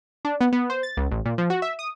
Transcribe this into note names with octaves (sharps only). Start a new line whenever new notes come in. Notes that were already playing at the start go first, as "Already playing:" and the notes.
D4
B3
B3
C5
A6
C#2
A1
A#2
F3
F#4
E5
D#6